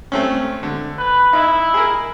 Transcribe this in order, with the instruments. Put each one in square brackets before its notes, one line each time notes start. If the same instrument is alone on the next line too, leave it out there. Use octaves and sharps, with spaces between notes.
[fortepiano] A3 C4 C#4
D3
[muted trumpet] B4
[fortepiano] D#4 [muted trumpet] E4
[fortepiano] G#4 A#4